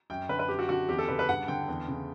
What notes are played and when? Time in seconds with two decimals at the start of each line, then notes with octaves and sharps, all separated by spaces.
0.10 F#2 G5
0.29 D3 B4
0.39 B4
0.49 F#2 G4
0.59 F#4
0.69 D3 F#4
0.89 E2 G4
0.98 A4
1.08 C#3 B4
1.19 B4
1.28 G2 F#5
1.48 D3 G5
1.68 E2
1.88 C#3